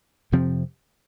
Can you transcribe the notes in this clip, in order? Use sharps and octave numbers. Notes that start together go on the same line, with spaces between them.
F2 C3 F3 C4